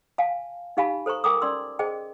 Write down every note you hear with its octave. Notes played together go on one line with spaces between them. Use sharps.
F5 G#5 A5
D#4 G4 F5 G#5 A5 B5
A4 C5 A#5 C#6
A#4 G5 G#5 A#5 D6 D#6
C#4 D5 C6 E6
G#4 C5 D#5 G5 A5